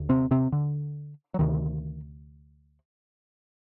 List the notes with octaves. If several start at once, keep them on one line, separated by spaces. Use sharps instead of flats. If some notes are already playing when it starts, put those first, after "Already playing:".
Already playing: D#2 D3
C3 C4
C3 C4
D3
F#3
D2 C3 D#3